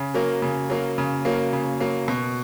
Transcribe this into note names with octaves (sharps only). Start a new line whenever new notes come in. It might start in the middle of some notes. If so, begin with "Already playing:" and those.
Already playing: C#3
F#3 A#3
C#3
F#3 A#3
C#3
F#3 A#3
C#3
F#3 A#3
B2